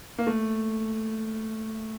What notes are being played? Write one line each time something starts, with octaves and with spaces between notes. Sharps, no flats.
A#3
A3